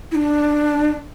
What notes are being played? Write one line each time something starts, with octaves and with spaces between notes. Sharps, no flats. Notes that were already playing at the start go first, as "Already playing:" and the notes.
E4
D4